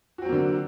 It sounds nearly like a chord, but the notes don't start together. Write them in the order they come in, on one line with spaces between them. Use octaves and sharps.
F#4 C4 F#3 A#3 D3